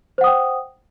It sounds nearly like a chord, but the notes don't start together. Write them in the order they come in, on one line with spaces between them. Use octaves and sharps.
C5 F#5 D#6 G5